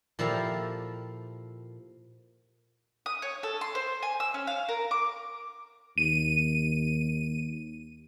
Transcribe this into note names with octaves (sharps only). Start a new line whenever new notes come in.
A#2 F3 E4 G4 A4 F5
D#6
C#5
A4
C6
C5
G#5
E6
C#4
F5
A#4
D6
D#2 D#7